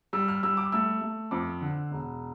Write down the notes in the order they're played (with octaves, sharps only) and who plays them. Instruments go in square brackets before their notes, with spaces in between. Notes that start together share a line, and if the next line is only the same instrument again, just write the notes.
[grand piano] G3 E6
F6
G3 E6
D6
A3 E6
A3
F2 D6
D3
E1